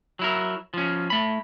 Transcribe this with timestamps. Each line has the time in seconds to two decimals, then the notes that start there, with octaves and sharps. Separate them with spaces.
0.19 F#3 E4 A#4
0.74 F3 C#4
1.10 A3 B5